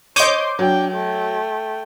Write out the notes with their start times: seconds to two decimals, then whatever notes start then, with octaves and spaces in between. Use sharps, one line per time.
0.16 C5 C#5 D#5 C6 D6 G6 D#7
0.59 F#3 D4 G5
0.92 A3 G5